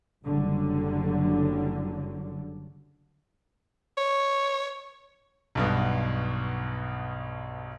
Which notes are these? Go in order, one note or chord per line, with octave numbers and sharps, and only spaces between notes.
F#1 D3 F#3 G3
C#5
B1 G2 B2